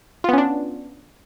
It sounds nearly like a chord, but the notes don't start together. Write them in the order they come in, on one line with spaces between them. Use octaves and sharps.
F4 B3 C#4 D4